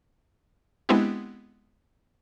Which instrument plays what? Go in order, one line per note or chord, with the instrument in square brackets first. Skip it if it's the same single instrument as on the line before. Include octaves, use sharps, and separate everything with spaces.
[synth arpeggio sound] G#3 B3 C4 D4 E4 G4